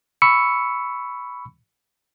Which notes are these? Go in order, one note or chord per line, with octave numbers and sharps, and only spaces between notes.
B5 C#6 E6 C#7